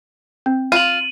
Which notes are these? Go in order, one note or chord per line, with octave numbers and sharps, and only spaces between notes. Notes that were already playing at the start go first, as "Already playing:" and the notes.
C4
F4 D#7 F#7